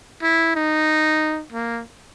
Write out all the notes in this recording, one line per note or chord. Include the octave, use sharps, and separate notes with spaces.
E4
D#4
A#3